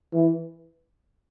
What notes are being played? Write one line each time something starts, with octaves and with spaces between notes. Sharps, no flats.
E3